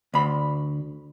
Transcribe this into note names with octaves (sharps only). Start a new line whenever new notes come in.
D2 B5